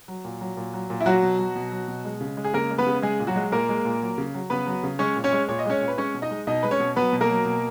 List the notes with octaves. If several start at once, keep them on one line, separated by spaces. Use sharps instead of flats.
F#3
A#2
F#3
A#2
F#3
A#2
E4
F#3 F#4
B2
F#3
B2
F#3
B2
G#3
C#3
G#3
G#4
C#3 A#3 A#4
G#3
B3 B4
C#3
G#3 G#4
A#2
F#3 F#4
G#3
A#2 A#3 A#4
G#3
A#2
F#3
C#3
F#3
C#3 B3 B4
F#3
C#3
G#3 C#4 C#5
A#2
C#4 C#5
G#3
A#2 C#5
D#5
G#3 C#4 C#5
A#2
B4
G#3 C#4 C#5
B2
D#4 D#5
G#3
B2 D#4 D#5
G#3 B4
C#4 C#5
B2
F#3 B3 B4
B2
A#3 A#4
F#3
B2